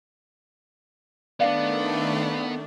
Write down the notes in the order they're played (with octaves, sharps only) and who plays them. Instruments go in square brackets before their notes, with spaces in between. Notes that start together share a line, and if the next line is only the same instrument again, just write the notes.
[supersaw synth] D#3 A3 [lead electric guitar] B3 [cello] D4 [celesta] D5 F5